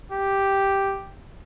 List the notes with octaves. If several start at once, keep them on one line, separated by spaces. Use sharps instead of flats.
G4